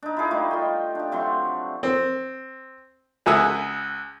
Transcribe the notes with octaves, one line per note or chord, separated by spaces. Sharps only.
D4 D#4
E4 F4 G#4 D6
G3 A3 D#4 E4
F4 D#5 G5
D4 G4
C3 F#3 A3 C6
C4
C#2 F#4 G#4 E5 D#6